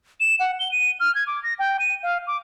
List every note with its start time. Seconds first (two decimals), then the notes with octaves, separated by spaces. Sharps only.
0.20 E7
0.40 F#5
0.60 G7
0.72 D#7
1.00 F6
1.15 G#6
1.27 D6
1.43 A#6
1.59 G5
1.80 D#7
2.03 F5
2.27 D6